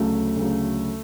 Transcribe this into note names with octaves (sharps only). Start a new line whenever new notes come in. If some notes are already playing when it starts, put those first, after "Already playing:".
Already playing: D2 C#3 F#3 A3
D2 C#3 F#3